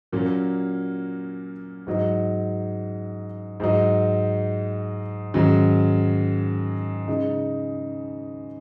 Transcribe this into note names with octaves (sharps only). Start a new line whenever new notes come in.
A#2 F#3 A#3 C#4
G#2 F#3 D#4
G#2 F#3 D#4
G#2 D#3 F#3 C#4
C#3 G#3 D#4